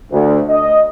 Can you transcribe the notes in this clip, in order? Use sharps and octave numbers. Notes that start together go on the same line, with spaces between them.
D2
D#5